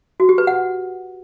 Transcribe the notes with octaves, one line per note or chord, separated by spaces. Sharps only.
F#4
G4
B4
F#5